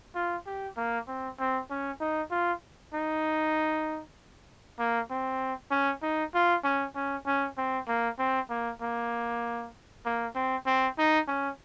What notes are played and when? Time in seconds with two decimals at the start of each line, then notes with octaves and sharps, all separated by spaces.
0.15 F4
0.46 G4
0.77 A#3
1.07 C4
1.39 C4
1.70 C#4
2.00 D#4
2.31 F4
2.93 D#4
4.79 A#3
5.10 C4
5.71 C#4
6.02 D#4
6.34 F4
6.64 C#4
6.95 C#4
7.26 C#4
7.57 C4
7.87 A#3
8.19 C4
8.49 A#3
8.81 A#3
10.05 A#3
10.35 C4
10.66 C4
10.98 D#4
11.28 C#4